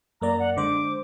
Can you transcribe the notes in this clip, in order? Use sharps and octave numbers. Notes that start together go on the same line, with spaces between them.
F#2 A#3 D5 A#5
F#5
D3 G#3 C5 D6